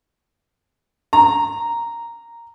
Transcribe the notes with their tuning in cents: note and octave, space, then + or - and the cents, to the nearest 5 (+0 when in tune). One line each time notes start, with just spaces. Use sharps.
A#5 -5